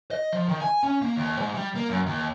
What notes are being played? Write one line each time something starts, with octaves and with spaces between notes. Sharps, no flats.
D#5
F3
D#3
G#5
C#4
A#3
D#2
G#2
G3
A#3
F#2
D#2